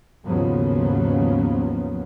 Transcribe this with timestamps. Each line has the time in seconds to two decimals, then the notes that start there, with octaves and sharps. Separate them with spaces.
0.24 D#2 G#2 C#3 F3 F#3 B3